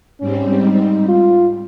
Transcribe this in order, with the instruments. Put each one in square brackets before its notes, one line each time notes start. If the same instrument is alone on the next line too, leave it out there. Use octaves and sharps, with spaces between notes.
[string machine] G#2 G3 C4 [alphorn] C#4
[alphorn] D#4
F4